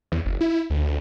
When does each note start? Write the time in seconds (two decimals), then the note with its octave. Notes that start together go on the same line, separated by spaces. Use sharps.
0.12 E2
0.25 F#1
0.41 E4
0.70 D2